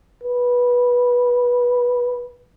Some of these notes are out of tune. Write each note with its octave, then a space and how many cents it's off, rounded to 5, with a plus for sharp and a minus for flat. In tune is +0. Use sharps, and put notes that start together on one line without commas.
B4 -15